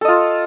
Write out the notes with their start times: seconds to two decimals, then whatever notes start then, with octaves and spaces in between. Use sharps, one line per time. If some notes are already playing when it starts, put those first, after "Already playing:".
0.01 A4
0.05 D#5
0.08 F4